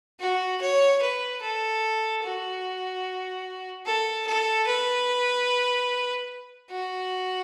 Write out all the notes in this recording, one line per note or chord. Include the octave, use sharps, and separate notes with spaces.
F#4
C#5
B4
A4
F#4
A4
A4
B4
F#4